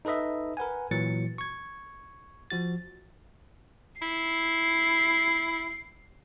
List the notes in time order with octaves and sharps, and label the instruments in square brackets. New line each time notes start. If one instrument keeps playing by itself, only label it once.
[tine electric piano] D#4 A4 B4 D#5 E5
A#4 B4 F#5 G#5
A#2 E3 F#3 A6 C#7
C#6 G#6
F3 F#4 A6
[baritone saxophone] E4 [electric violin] C7